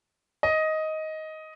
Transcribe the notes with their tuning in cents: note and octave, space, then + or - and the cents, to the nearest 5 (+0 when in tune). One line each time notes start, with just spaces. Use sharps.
D#5 +10